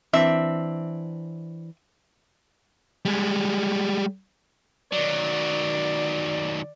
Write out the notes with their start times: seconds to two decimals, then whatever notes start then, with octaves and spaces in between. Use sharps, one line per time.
0.13 E3 C4 D4 E5
3.05 G3 G#3
4.92 D#3 F#3 D5